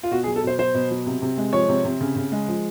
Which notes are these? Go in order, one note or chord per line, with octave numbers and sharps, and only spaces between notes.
F4
B2 F#4
G#4
F#3
A4
B2 C5
F#3 C5
B2
F#3
C3
C3
G#3
F3 C#5
C3
C3
C#3
C#3
G#3
F3